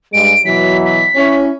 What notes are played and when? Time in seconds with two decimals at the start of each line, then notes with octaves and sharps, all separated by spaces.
0.13 G2 G3 G#3 D7
0.45 B2 E3 F#3 B6
0.86 B6
1.16 C#4 E4